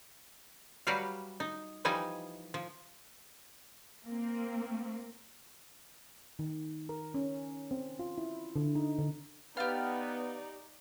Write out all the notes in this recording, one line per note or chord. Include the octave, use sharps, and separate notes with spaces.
F#3 G3 F#4 G4 B4 F5
D#4
E3 F3 G3 D#4 G#5
F3
A#3 C4
D#3
A#4
C#4
C4
F4
E4
D3
D#4
D3
B3 D#4 G4 B4 D5 F5 F6 A6